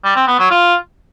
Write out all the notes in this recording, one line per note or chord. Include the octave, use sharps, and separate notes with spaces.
G3
C4
B3
F#3
F4